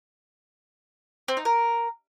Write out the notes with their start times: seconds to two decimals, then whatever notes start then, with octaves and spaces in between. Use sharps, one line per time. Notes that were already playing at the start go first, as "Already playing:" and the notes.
1.28 C4
1.37 D#4
1.45 A#4